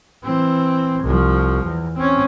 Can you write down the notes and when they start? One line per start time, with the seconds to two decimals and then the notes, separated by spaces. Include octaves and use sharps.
0.24 E3 C4
1.03 C2 F3
1.64 E2
1.96 C4 C#4